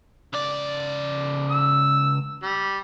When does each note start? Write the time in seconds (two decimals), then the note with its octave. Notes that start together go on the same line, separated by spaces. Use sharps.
0.33 C#2 D5
1.51 E6
2.43 G3